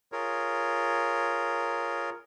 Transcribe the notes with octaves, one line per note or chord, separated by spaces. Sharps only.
F4 G#4 A#4 C#5